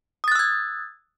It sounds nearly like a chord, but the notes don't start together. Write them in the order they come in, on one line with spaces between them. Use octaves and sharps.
D#6 A6 F#6 E6 G#6